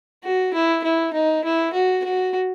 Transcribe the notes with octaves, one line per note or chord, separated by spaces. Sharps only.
F#4
E4
E4
D#4
E4
F#4
F#4